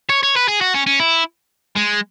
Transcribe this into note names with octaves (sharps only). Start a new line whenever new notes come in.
C#5
C#5
B4
G#4
F#4
C#4
C#4
E4
G#3